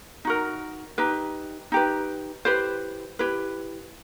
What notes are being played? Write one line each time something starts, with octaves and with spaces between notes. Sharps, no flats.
D#4 F#4 A#4
D#4 G4 B4
D#4 G4 B4
E4 G4 B4 C5
E4 G4 B4